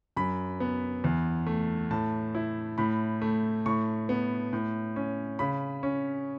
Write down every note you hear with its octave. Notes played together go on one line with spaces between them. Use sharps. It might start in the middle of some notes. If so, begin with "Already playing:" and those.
F#2 B5
B3
E2
A3
A2 A5
E4
A2 B5
A3
A2 C#6
B3
A2
C#4
C#3 B5
C#4